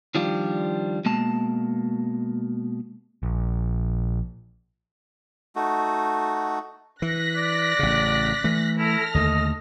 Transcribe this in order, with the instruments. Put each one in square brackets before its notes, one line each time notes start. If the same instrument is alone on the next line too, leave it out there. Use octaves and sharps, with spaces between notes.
[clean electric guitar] D#3 F3 G3 D4 F4 G4
B2 G#3 A#3 A5
[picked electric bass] A#1
[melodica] A3 D#4 F#4
[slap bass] E3 [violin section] F#6 A#6 B6
[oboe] D5
[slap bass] A1 C#3
E3 A3
[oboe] E4 [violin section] A4 F6 A#6
[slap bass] D#2 D3 A3 [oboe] D#5